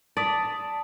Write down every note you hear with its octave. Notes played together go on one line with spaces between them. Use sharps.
D5 A5 D#6 B6